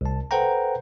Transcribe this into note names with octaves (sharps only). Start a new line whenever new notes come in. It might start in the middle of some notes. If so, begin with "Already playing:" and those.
C2 A5
A4 B4 C5 F#5 G5 A#5